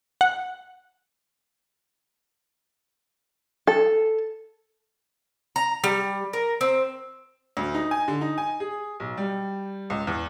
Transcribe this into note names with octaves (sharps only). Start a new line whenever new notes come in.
F#5
A4
A#5
G3
A#4
C4
D2
D#4
G#5
D3
D#4
G#5
G#4
B1
G3
C#2
E2